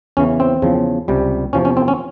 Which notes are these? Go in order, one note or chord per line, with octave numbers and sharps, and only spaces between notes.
E2 C#3 E3 C#4
C4
E2 C#3 F3
C#2 C3 G3
E2 C3 F3 C#4
C#4
C4
C#4